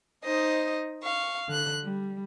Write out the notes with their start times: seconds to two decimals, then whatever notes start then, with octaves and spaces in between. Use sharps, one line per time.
0.24 D#4 C5 D#5
1.02 F5 C#6
1.48 D3 F#6
1.83 G3